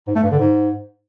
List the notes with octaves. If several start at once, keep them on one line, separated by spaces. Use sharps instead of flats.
G#2
A3
G2
D3
G#2